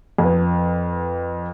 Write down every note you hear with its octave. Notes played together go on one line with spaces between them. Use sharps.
F2 B4